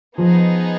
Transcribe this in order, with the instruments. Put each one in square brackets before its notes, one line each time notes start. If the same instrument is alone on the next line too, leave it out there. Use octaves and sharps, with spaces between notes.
[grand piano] F3 [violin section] B3 D#4 G#4